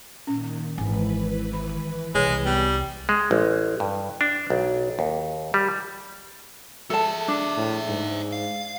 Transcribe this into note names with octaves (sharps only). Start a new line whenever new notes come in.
A#2 D#3 C#4
G#1 E3 B4 G#5
D#3 B5
C2 G#3 C#5
G3 B3
G#3
A1
G2
D4
B1
D#2
G3
G#4 A4 E5 A5
D4
A2
G#2
F5